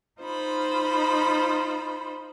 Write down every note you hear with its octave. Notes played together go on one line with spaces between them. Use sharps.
D#4 F4 C5 B5